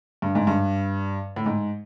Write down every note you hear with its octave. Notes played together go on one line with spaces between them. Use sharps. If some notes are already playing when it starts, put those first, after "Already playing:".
G2
G#2
G2
A2
G#2